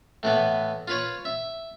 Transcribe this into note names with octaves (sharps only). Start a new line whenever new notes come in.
A2 E3 B3
F4 B4 C#5
E5